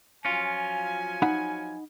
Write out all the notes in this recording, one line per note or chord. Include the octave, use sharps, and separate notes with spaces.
F3 F#3 C#4 F4 G#5
D#4 F#5 B5